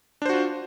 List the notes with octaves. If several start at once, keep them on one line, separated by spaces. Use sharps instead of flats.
D4 F4 F#4 C5